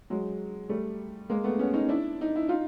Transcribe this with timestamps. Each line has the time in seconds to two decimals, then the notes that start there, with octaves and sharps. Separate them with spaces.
0.10 F#3 G#3
0.69 G3 A3
1.30 G#3 A#3
1.44 A3 B3
1.59 B3 C#4
1.74 C#4 D#4
1.89 D4 E4
2.21 D#4
2.36 E4
2.49 D#4 F4